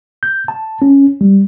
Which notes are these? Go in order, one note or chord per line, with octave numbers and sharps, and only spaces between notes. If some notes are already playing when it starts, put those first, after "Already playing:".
G6
A5
C#4
G3